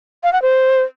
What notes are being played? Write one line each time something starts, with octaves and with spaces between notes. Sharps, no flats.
F5
F#5
C5